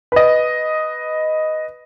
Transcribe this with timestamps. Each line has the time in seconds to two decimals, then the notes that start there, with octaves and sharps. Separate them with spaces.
0.12 B4 D#5